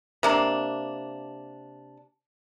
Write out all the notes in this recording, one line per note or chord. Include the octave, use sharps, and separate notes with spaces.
C3 A#3 D4